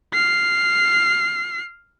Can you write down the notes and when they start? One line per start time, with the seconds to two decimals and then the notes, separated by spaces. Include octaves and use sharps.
0.14 F6 C7